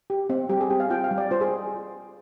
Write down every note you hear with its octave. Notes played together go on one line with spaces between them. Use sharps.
G4
C4
G3 G4
G#4
C4 G4
F5
F4 G5
F5
G3
D5
F4 C5
G#4